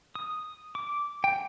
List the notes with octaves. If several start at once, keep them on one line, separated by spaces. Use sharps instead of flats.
D#6
D6
G5